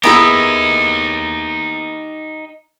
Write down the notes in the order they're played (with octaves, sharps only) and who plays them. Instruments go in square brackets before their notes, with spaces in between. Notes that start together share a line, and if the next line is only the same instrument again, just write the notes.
[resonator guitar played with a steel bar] B3 E4 G#4 [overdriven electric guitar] D#4 G4 [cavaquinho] A#4 B5